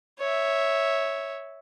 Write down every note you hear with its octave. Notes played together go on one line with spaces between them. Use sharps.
C#5 E5